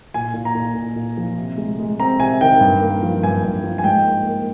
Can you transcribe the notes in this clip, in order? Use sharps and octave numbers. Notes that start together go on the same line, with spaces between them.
A#2 G#5
A#2
A#5
A#2
A#2
A#2
F3
C3
G#3
G#3
C4 A#5
C3 G#5
D#3 G5
G2
A#3
F3
G2 G#5
G2
F3
G#5
G#2 G5
A#3
A#3